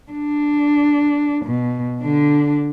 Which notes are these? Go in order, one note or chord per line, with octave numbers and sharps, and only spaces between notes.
D4
B2
D3 D4